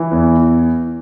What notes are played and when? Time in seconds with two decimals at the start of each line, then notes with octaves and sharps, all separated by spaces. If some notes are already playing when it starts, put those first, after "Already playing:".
Already playing: E3
0.11 E2